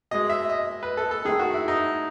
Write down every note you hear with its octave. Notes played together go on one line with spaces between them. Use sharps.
B2 G#3 D#5
E5
D#5
B4
A4
A4
D#3 A3 G#4
F#4
E4
D#4